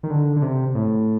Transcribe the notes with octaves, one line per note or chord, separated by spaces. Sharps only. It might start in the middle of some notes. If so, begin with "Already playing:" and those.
D#3
D3
D3
C3
A2